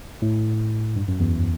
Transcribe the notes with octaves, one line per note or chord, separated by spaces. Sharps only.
A2
G2
F#2
E2